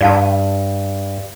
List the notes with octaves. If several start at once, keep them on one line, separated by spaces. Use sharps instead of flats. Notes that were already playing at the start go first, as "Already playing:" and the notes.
G2 D5 F5 A5